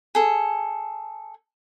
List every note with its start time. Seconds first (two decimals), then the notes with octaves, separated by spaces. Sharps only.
0.15 G#4 A4